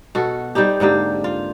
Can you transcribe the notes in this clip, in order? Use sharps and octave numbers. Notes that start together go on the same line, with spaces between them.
B2 F#4 A4
G3 C4 D#4 G4
G#2 D3 A#3 G4
F4